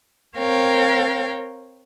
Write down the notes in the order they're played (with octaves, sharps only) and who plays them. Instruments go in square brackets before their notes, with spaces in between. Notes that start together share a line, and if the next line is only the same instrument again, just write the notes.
[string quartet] C4 A#4 C#5 F5 G5